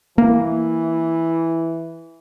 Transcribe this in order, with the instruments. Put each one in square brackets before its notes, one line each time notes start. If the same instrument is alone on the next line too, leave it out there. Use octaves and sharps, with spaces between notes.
[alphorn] E3 [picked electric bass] A#3